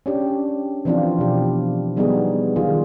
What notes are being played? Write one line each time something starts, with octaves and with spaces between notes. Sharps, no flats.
C#4 D4 G4
E3 F3 C4 D4 E4 F4
B2 G4
F#3 G3 B3 D#4 F#4 G#4
D#3 F4 G#4